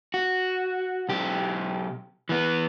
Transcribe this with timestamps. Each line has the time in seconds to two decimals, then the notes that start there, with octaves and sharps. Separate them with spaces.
0.14 F#4
1.09 B1 G4
2.29 E3 B3